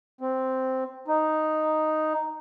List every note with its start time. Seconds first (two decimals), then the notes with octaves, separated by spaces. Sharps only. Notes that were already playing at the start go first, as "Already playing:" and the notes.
0.21 C4
1.08 D#4